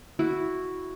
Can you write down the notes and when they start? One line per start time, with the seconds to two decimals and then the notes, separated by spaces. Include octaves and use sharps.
0.19 E4 F#4